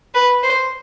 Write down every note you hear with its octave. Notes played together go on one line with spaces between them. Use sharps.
B4
C5